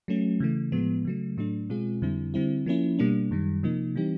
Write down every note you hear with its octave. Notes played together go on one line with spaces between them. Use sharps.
F#3 A3 C#4
C#3 E3 A3
A2 F3 G#3 B3
C#3 F#3 A3
A2 F#3 A3 D4
B2 G#3 C4 F4 G#4
F2 D3 G3 C4 E4
D3 G3 C4 E4
F3 A#3 C#4 E4
B2 G3 A#3 D4
F#2 D#3 G3
C3 F3 A#3 D#4
E3 G3 C4 D#4 G4